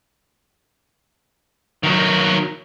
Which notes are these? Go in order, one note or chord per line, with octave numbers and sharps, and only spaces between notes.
D#3 F#3